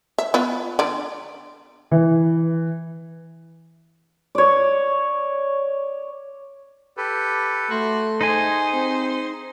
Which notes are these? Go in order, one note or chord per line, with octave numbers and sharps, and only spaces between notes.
E5
B3 F4 B4
D3 D5
E3
C#5 D5
G4 A4 B4
A3 F#4 C6
D#4 G#4 C5 G#5
C4